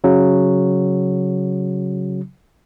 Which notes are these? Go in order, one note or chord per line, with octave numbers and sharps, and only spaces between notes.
C#3 F#3